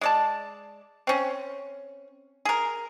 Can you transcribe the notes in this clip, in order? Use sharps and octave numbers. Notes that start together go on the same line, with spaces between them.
G#3 D5 A5
C4 C#4
G#4 A#4